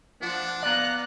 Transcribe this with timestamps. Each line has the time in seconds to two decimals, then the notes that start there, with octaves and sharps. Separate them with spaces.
0.22 F3 D4 F#5
0.63 B3 D5 F5 A#5 F#6